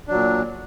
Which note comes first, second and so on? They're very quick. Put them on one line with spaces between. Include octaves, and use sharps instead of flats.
D4 F#3 A#2